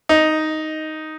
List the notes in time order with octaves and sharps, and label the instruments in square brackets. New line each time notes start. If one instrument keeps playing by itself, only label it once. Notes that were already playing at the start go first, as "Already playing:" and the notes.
[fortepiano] D#4